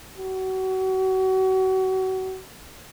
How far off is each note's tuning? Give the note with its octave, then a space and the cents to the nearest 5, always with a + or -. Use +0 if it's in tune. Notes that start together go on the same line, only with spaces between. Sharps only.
F#4 +30